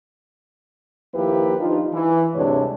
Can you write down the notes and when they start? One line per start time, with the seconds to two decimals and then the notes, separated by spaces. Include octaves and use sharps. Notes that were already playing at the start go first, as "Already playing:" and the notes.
1.14 D#2 F3 A#3 E4 G4 B4
1.60 F3 D4 D#4 F4
1.92 E3
2.35 D2 G2 C3 G#3 D4 C#5